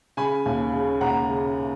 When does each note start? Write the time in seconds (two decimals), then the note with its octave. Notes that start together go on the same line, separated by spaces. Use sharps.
0.17 C#3 G#5 B5
0.46 D#2
0.73 C#3
1.01 D#2 F#5 A#5
1.29 C#3